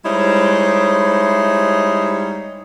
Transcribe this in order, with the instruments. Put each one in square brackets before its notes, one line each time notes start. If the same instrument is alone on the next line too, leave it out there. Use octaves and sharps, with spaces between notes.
[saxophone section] G3 G#3 D#4 E4 C5 C#5